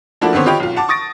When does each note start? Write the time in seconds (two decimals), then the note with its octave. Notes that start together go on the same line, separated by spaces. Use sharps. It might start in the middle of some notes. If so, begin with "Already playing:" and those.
0.21 F3 A3 A#3 D4 E4 F#4
0.33 D3 D#3 B3 C4 C#5
0.46 F4 G4 B4 C#5 D#5 G5
0.60 B1 F4
0.76 F#5 A5 D6
0.89 C#6 D#6 A6 A#6 D7